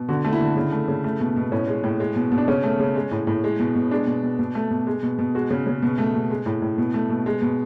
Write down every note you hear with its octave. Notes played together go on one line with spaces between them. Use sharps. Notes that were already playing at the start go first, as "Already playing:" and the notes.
Already playing: B2
D3 F#4
A3
E4
D3
C#3
A3
C#3
A3
B2
B2
A2 C#4
G#3
A2
G#3
B2
B2
D4
C#3 C#4
A3
C#3
G#3
A2
A2
G#3
B2
B2
G#3 D4
B2
B2
B2
A3
B2
G#3
B2
B2
G#3 F#4
C#3
C#3
B2
A3
B2
G#3
A2
A2
B2
A3
B2
G#3
B2